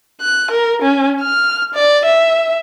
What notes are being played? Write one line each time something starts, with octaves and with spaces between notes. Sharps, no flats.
F#6
A#4
C#4
F6
D5
E5